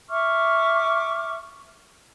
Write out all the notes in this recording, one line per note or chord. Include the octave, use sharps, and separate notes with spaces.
E5 C#6 D6 F6